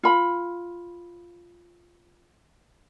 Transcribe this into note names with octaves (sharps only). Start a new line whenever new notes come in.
F4 B5